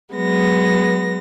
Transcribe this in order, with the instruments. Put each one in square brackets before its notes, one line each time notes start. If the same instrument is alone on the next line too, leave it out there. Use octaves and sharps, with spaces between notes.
[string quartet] F#3 G#3 B3 A#6